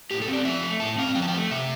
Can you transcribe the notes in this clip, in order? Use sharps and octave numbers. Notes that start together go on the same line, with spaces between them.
A2 G4
A4
C4
D5
F3 E5
A3
A2 A5
C4 F5
F3 G5
A5
G5
A3
C3 E5